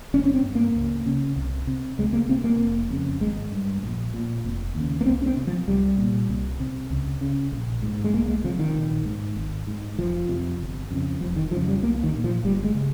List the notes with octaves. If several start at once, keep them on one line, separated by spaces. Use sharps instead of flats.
G1 C#4
C#4
C4
G2
A#3
C#2
C#3
C2
C3
C#2 G#3
A#3
C3 C4
A#3
F1
F2 C#3
G#1 G#3
G2
A#1
A#2
F1
D#2 C#3
A#3
C2 C4
C#4
C4
C3
F3
C2 G3
A#2
C2
C3
C#2
C#3
A#1
G#2
G#3
C2 A#3
G#3
C3 F3
D#3
A#1
G#2
G#1
G#2
F1 F3
F2 C3
G1
F2 C#3
F1 F3
D#3
F2 C#3 F3
F3
G3
C2 A#3
D#3
A#2
F3
G1 G3
G#3
C#3